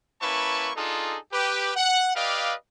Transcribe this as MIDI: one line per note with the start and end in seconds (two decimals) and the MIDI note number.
0.22 0.70 58
0.22 0.70 61
0.22 0.70 64
0.22 0.70 71
0.22 0.70 81
0.22 0.70 85
0.76 1.17 62
0.76 1.17 63
0.76 1.17 65
0.76 1.17 68
0.76 1.17 69
1.33 1.72 67
1.33 1.72 71
1.76 2.15 78
2.15 2.54 67
2.15 2.54 71
2.15 2.54 74
2.15 2.54 75
2.15 2.54 77